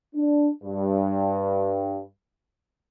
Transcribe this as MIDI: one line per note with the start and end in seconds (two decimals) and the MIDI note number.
0.16 0.49 62
0.64 1.99 43